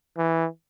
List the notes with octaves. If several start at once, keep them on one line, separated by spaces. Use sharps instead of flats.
E3